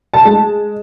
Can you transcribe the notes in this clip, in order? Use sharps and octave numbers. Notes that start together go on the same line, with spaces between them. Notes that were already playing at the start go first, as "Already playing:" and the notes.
A5
G#3